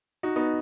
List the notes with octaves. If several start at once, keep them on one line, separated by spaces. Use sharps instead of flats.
D#4 F#4
B3 D#4